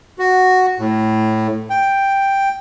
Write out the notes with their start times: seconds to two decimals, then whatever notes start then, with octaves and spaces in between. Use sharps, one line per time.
0.19 F#4
0.79 A2
1.70 G5